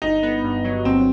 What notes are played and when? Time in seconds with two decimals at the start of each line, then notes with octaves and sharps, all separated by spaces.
0.02 G1 D#4
0.23 B3
0.44 G2
0.64 F#3
0.85 G1 C4